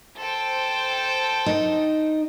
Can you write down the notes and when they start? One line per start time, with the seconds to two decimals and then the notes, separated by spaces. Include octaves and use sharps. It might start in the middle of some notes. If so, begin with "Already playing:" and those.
0.17 A4 C5 G5
1.46 D#4